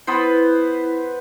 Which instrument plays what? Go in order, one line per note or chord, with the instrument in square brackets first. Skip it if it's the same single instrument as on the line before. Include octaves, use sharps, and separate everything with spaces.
[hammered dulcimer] B3 B4 C5 [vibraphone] E4